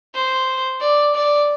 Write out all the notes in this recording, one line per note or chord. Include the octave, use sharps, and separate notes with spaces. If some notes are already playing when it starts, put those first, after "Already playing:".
C5
D5
D5